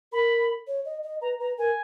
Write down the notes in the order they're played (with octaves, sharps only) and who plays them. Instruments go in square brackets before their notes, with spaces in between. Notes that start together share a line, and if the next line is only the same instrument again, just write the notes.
[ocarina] A#4 [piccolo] B5
[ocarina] C#5
D#5
D#5
[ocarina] B4 [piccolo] A#5
[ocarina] B4 [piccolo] A#5
[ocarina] A#4 [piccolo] G#5